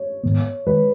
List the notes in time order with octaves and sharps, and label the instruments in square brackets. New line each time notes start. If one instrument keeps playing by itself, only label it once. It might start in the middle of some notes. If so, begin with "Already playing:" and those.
Already playing: [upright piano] C#5
[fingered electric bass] G#2 D#3 G#3 B3
[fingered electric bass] D#3 G#3 [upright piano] B4